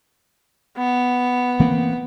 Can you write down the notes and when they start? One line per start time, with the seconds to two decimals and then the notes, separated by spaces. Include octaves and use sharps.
0.78 B3
1.60 E3 A#3 C4